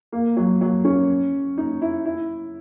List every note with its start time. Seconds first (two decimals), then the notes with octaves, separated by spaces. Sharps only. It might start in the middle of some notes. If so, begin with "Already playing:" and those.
0.12 A#3
0.37 F#3
0.61 F#3
0.85 C#4
1.58 D#4
1.81 E4
2.05 E4